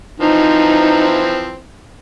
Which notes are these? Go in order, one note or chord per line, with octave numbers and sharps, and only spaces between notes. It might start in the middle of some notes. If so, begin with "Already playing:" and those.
E3 F3 C4 D#4